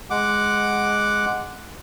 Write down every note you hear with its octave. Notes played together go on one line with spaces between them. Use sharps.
G#3 F#5 D6